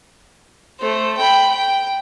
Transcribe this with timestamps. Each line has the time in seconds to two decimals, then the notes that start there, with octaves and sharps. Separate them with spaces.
0.80 A3 C5
1.17 G5 B5
1.50 G5